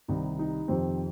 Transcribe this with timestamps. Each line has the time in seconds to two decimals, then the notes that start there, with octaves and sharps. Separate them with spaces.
0.08 C2 C3 D#3 D#4
0.39 D#4
0.68 F2 C3 D#3 C4